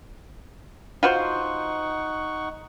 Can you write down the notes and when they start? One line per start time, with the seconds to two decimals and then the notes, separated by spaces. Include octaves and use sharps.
1.03 D#4 F4 F#4 C5 F#5 C#6